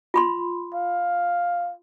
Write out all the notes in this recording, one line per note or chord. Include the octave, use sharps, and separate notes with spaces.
F4 B5 C6
F5